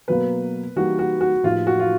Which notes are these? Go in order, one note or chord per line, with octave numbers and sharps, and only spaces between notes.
B2 F#3 A#3 B4
E3 G3 A#3 D#4 F#4 G4
F#4
F#4
A2 F3 A#3 D#4 F4 G4
F#4
F4